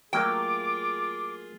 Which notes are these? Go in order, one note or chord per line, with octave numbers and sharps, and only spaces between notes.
F#3 A3 A#3 F4 G#4 G5 D6